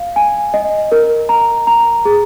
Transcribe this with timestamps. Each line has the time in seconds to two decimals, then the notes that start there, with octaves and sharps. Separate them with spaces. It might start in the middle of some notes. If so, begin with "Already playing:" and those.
Already playing: F5
0.16 G#5
0.54 D#5
0.92 A#4
1.29 A#5
1.67 A#5
2.05 G#4